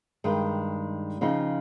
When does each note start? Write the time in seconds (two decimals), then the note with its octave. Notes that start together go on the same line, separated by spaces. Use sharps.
0.24 G2 D#3 G#3
1.21 C#3 F3 C4 D#4